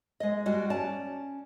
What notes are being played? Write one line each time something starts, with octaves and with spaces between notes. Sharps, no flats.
G#3 D#5
G3 G#3 F#4 D5
C#4 D5 A5